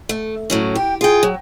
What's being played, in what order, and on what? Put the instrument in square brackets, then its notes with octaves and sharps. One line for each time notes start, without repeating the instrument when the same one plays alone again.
[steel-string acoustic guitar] A3
A2 F#3 C#4
[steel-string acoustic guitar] G4 [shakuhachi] G5
[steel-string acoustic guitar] F4 G5 [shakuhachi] G#4
[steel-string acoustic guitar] F#3